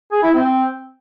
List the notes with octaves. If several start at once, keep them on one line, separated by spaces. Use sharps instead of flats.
G#4
E4
C4